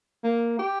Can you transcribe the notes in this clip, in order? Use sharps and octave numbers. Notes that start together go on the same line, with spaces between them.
A#3
G4